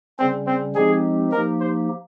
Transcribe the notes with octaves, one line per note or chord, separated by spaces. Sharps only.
C#3 G3 C4 C#4
C4
F3 G#3 C4 D#4 G4 G#4
F3 A#3 D#4 G4 A#4
C5